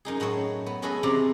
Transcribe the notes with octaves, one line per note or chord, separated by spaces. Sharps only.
F#2 D#4 G#4
A2 F#3 A3 C#5
B3
C#4 F#4 G#4 A4 B4 D#5
E2 C3 C#4 D5 A#5